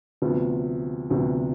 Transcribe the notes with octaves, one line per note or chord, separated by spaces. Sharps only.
D2 C3 F3 B3
D2 C3 F3 B3